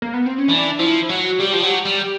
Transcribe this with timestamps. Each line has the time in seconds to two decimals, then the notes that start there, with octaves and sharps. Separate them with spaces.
0.02 A#3
0.14 B3
0.26 C4
0.38 C#4
0.49 E3 D4
0.79 F3 E4
1.09 F#3 F#4
1.40 G3 G4
1.52 F3
1.63 F#3
1.86 G3